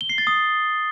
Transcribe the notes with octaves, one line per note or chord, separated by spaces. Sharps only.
G7
C7
A6
D#6